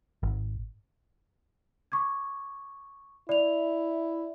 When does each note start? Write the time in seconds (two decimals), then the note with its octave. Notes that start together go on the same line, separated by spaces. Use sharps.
0.23 G#1
1.92 C#6 D6 G#6
3.29 E4 D5 F7